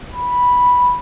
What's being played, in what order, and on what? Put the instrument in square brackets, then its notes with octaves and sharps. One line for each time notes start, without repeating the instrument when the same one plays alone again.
[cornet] B5